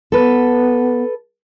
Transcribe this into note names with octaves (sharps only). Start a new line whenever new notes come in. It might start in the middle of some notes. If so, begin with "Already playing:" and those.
B3 A4 B4